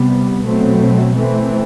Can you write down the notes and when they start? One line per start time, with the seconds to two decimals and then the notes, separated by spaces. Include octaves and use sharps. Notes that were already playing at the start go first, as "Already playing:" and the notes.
Already playing: C3 G3 B3
0.44 B2 F#3 A3 C4
1.16 E3 A3 C4